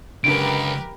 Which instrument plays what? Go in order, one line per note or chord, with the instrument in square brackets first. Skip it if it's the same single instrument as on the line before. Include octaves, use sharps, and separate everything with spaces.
[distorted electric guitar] C#2 [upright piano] F#2 D3 [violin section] G4 A#4 B4 [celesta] D7